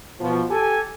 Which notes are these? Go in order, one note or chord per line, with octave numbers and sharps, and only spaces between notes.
B2 F3
G4 A4 G#5